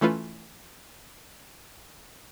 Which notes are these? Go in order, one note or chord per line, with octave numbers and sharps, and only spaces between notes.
E3 A3 C#4 F4 B4